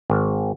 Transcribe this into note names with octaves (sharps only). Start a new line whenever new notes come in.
G#1